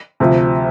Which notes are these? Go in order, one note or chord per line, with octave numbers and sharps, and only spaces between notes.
D2 C3 F3